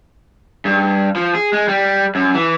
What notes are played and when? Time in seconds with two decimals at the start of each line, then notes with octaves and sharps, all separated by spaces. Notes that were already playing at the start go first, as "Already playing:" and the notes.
0.65 G2
1.16 F3
1.35 G#4
1.53 G#3
1.68 G3
2.15 F#2
2.35 E3